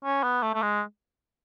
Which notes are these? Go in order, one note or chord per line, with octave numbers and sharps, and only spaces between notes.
C#4
B3
A3
A3
G#3